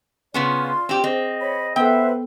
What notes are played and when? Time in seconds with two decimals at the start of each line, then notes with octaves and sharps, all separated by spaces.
0.34 C#3 B3 C#4 F4 D5 C6
0.89 C4 G4
1.04 C4 G#4 C5 D#5
1.41 C#5 B5
1.76 B3 A4 B4 C5 E5 F#5 G5